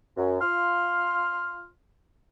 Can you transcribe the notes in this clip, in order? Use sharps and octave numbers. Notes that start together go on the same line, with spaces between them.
F#2
F4 C6 F6